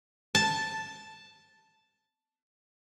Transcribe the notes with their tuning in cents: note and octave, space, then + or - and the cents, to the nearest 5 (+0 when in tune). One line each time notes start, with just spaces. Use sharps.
A5 +0